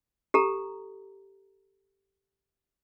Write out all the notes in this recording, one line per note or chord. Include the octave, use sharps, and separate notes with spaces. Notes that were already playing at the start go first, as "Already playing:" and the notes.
G4 A4 A#5